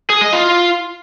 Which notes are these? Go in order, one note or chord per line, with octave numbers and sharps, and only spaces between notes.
G#4
D#5
F4